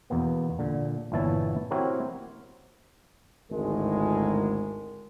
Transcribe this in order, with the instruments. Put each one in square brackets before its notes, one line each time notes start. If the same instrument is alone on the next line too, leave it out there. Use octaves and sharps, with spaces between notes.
[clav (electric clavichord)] E2 B2 A#3 B3
A#2 D3
G1 A#2 E3 E4 C#5 A5
C4 E4 F#4 G4 A#4 C#5
[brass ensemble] G#1 D2 A2 G#3 A#4